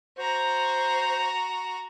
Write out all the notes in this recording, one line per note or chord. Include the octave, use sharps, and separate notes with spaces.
F#4 C5 A#5